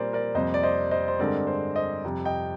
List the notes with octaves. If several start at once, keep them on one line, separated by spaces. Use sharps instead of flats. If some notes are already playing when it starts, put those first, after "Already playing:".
Already playing: A#2 G3 C4 A#4 C5 D5
A#4 D5
F2 C3 G3 A#3 C5 D#5
D5
C5 D#5
C5 D#5
C5
G2 D3 G#3 C4 A#4 D5
C5
C5 D#5
F2 C3 G3
D#5 G5